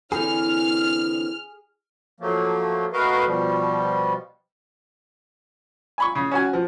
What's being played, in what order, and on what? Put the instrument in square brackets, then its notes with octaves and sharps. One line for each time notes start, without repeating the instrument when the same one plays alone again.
[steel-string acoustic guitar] D3 E3 C4 [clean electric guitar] G#4 [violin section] F6
[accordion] F3 F#3 A3 A#3
A3 F#4 A#4 B4 D#5 F5
B2 F3 G3
[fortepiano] G#5 B5 C#6
C#3
C#4 F#4 G#5
F3